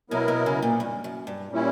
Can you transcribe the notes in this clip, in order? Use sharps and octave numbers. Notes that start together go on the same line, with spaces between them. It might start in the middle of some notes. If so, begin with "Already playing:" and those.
B2 F#3 B3 E4 A#4
B2
C#3
A#2
G2
F#2
G2
A#2 G3 C#4 E4